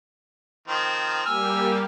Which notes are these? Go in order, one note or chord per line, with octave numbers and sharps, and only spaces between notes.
D#3 F3 C4
G3 A#3 G4 G#5 E6 F6